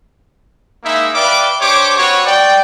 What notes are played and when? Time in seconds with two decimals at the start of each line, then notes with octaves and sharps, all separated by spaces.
0.84 G#3 A#3 D#4 E4
1.14 B4 D5 E5 F5 G5 D6
1.61 D4 G4 C5 C#5 D6
1.97 C4 F#4 B4 C#5
2.26 D5 G5